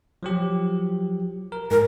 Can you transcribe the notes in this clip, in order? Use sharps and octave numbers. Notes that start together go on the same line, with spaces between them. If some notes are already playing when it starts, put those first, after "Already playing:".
F3 F#3 G4
A#4
G#2 A#4